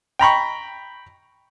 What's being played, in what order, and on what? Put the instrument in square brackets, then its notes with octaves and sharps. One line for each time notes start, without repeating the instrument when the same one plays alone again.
[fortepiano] G5 A#5 B5 C#6